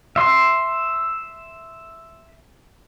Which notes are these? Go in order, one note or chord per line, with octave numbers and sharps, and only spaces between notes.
E5 C6